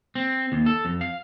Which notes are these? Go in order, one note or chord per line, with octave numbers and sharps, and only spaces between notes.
C4
D#2
A4
F2
F5